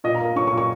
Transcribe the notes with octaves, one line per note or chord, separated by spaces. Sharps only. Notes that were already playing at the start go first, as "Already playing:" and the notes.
A#2 D#5
A#5
A#3
C#4 C#6
C#6
A#2
C#6